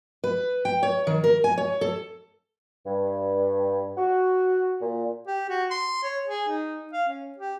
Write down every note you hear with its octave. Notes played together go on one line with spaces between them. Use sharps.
B4
G5
C#5
D#3
A#4
G#5
C#5
A4
G2
F#4
A#2
G4
F#4
C6
C#5
G#4
D#4
F5
C#4
G4